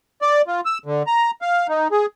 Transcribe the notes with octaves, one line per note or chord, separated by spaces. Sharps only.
D5
F4
E6
D3
A#5
F5
D#4
G#4